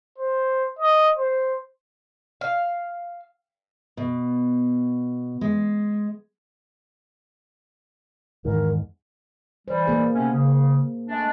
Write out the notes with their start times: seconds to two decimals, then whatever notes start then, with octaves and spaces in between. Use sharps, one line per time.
0.18 C5
0.79 D#5
1.17 C5
2.41 F5
3.97 B2
5.41 G#3
8.45 E2 G#2 D#3 A#4
9.68 E3 G3 C5
9.87 A#3 G#4
10.14 C3 B3 C#4
10.33 C#3
11.07 G#3 A3 D4